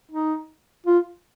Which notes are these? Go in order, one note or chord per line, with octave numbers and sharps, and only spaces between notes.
D#4
F4